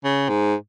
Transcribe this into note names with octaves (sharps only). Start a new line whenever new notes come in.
C#3
G#2